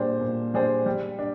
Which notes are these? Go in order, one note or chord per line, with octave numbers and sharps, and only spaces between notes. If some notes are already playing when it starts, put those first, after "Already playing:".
Already playing: A#2 G3 D4 G#4 C5
A#2
G3 D4 G#4 C5
G3
D4